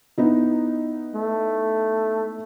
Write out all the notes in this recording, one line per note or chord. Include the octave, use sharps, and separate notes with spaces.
B3 D#4 E4
A3